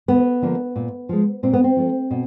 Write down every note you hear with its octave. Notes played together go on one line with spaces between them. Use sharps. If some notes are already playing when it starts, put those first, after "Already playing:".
D2 B3
D3 F3 A#3
A#2
F3 G#3
A#2 C4
B3
C4
F3 A3
B2